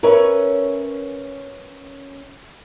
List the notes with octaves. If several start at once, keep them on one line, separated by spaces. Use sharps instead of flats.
C#4 A#4 B4 C#5 E5